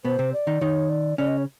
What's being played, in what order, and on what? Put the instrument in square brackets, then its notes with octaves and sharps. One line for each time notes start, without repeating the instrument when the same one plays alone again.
[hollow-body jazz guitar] B2 B3 [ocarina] C5
[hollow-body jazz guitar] C3 C4
[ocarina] D5
[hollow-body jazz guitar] D#3 D#4
[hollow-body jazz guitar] D#3 D#4 [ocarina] C#5
[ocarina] D5
[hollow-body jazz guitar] C#3 C#4 [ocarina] D5
[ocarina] D#5
C#5